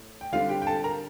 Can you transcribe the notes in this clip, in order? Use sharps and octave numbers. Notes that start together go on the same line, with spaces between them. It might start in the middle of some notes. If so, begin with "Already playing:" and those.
Already playing: A2
G5
D3 G3 C4 F4 F5
G4 G5
G5
A4 A5
A#4 A#5